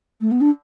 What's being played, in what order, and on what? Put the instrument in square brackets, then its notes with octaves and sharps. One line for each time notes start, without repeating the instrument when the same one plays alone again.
[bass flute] A3
B3
D4